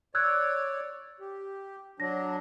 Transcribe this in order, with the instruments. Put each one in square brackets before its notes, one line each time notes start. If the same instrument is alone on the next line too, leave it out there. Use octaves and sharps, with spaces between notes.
[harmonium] C#5 D5 [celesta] E6 F#6 G#6
[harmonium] G4
[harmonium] F#3 D4 [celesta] A#6